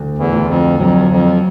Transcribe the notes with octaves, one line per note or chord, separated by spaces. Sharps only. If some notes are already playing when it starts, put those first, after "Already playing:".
Already playing: D2
E2
D2
F2
F2 F#3
F2